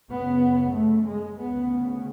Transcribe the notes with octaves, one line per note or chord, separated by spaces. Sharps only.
F#2 C#3 B3
A3
G#3
D2 C#3 B3